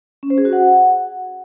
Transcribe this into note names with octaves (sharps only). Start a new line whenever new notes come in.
C#4
C5
G#4
F#4
F#5